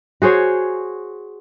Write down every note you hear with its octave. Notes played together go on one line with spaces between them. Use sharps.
F#4 G#4 C5 C#5